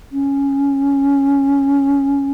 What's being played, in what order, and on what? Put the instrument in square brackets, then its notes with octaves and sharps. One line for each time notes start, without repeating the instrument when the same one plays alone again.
[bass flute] C#4